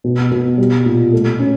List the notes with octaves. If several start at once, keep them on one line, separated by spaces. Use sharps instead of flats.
B2
B2
G3
A#2
A3
C#4